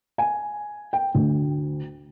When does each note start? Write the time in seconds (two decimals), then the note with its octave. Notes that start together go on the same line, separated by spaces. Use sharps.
0.18 G#5
0.93 G5
1.15 D2